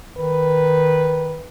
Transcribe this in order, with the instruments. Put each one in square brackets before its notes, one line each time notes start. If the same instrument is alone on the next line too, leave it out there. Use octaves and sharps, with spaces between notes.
[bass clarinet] D#3 [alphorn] B4